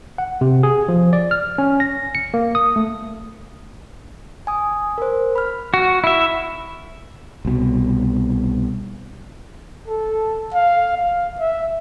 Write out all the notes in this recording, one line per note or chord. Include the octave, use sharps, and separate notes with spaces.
F#5
C3
G#4
F3
D5
F6
C#4
A#6
C#7
A#3
D#6
A3
G#5 D#6
A#4 C5
B5 F6
F#4
E4 E5
C2 B2
A4
F5
F5
E5